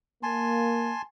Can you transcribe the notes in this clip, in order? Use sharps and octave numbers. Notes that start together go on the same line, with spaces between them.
A#3 G#5 A5 C6